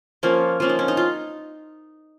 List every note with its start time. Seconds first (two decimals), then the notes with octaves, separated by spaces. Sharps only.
0.23 F3 A#3 C#4 C#5
0.60 F3 A#3 C#4 F4
0.69 D#4
0.79 C#4
0.88 D#4
0.97 F4